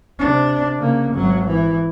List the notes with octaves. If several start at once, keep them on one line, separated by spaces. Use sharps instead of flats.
C3 D4
C#3 A#3
G#1 F#3
E3